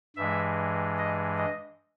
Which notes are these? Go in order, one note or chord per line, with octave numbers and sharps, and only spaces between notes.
G2 E3 G#3 E5
D#5
D#5